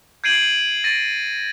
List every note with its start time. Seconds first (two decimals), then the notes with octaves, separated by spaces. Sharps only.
0.24 G6 G#6 C7 D7 D#7 F#7
0.84 A6 A#6 D7 D#7